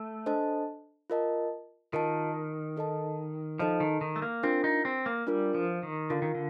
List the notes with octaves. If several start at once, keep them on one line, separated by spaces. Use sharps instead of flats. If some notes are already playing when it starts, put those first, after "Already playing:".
Already playing: A3
D4 A4 C5 D#5 A5
F4 A#4 D#5 A5
D#3 F4 A#4 D#5 A5
D#4 A4 D#5 A5
F3 D#4 A4 D#5 A5
D#3
D#3
A3
A#3
C4 D4 F4 A#4
D#4
C4
A#3
G3 D4 F4 A#4
F3
D#3
D3 F4 A#4 F5
D#3
D3